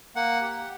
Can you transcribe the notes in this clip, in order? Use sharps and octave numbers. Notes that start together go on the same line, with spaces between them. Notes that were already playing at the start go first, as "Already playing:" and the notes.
A#3 F#5
G4